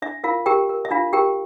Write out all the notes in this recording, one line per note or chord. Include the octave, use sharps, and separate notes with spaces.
D4 E5
F4 A#4 F5
G4 A#4 G5
A#4
E5
D4 F4 F5
G4 A#4 G5